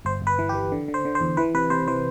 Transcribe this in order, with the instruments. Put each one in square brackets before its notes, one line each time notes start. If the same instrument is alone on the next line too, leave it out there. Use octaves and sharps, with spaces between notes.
[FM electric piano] G1 C5
G1 B4
E3
G4
E3
D3
D3
C5
D3
C5
E2
E3 B4
C3 B4
C3 C5
E3 C5